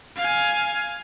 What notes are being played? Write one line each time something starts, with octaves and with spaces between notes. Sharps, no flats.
F5 G#5